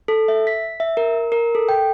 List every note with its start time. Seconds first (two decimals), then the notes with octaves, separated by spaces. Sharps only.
0.08 A4
0.28 E5
0.47 B6
0.80 E5
0.97 A#4
1.32 A#4
1.55 A4
1.69 G5